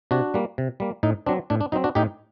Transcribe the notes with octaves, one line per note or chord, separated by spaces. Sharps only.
C3 D4 F#4
G3 A#3
C3
G3 A#3
A2 D#4
F#3 C4 D4
A2 D4
D4
F#3 C4 D#4
D4 F#4
A2 D#4 G4